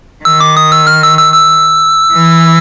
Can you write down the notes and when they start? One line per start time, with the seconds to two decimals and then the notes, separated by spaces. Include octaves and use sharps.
0.25 D#3 E6
0.40 D6
0.57 D#6
0.72 E6
0.87 F6
1.03 E6
1.18 E6
1.34 E6
2.12 E3